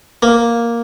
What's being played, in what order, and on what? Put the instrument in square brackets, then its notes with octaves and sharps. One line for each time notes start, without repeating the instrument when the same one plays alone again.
[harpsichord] A#3